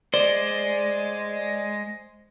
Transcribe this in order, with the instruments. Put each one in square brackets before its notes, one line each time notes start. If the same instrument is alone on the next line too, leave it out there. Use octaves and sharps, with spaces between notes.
[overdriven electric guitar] G#3 [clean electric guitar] C5 [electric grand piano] D5